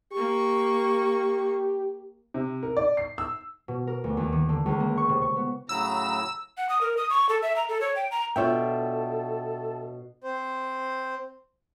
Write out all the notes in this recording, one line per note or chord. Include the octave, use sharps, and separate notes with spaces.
A#3 G4 C#6
C3
A#4
D5
C7
E6
B2
A#4
D2
D#2
D#3
D3
C#2
A#3
C#6
C3
C#6
B3
A2 C#3 F#3 A#5 E6
F#5
D#6
A#4
D#6
C#6
A4
E5
A#5
A4
C#5
G5
A#5
B2 D4 F4 A4 C#5 E5 G5
C4 C5